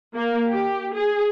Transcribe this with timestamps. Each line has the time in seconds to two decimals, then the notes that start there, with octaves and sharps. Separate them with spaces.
0.14 A#3
0.49 G4
0.93 G#4